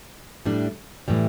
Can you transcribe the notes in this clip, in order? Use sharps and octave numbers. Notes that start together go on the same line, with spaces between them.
A2 G3 D4
A2 E3 G3